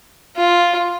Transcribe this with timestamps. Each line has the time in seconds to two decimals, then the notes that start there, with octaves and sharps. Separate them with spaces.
0.36 F4